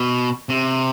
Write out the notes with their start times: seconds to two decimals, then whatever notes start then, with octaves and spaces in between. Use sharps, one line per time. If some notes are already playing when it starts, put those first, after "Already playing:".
Already playing: B2
0.49 C3